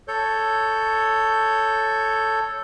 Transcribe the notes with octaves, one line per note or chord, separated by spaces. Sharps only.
A4 C#5 G6